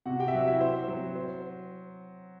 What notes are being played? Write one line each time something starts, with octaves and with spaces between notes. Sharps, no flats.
C3 F#4 F#5
G4 G5
E5
F#3 F#4 F#5
E4 E5
C4 C5
F#3
C5